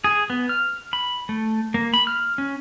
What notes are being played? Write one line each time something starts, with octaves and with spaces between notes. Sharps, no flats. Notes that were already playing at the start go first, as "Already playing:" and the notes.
G#4
B3
F6
B5
A3
A#3
B5
F6
C#4